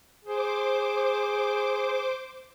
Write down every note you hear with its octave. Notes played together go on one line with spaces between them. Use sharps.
G#4 C5 D6